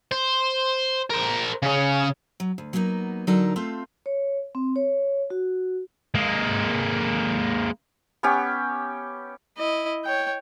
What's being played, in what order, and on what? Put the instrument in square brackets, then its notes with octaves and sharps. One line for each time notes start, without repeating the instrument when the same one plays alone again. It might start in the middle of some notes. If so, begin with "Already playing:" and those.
[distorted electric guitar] C5
A#4 C5
C#3 C#4
[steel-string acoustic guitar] F#3
D2
F#3 A#3 B3 C#4 D#4
D3 F#3 D#4 A4 A#4 D5
A3 C4 F4 A4
[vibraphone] C#5
C4
C#5
F#4
[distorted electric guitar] G#3 A#3
[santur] B3 C#4 G4
[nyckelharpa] E4 D#5
C#5 G5